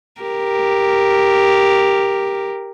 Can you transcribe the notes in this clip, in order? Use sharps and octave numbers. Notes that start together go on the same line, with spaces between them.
G4 A#4